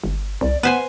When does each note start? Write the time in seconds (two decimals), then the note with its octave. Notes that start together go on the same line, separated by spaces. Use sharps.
0.04 G1
0.41 C2 D5
0.63 B3 B4 C5 F#5 G#5